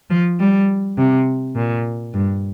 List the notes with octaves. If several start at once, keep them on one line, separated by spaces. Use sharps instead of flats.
F3
G3
C3
A#2
G2